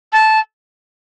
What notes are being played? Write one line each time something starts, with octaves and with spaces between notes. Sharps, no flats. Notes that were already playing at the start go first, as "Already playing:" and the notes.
A5